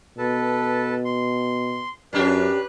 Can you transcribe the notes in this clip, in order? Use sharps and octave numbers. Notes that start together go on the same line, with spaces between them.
B2 A4 B4 A5
C6
F#2 C#4 D4 G4 B4 F#6